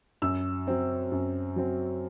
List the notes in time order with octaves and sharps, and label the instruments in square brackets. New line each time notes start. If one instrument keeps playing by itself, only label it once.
[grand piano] F#2 E6
F#3 C4
F#2
F#3 C4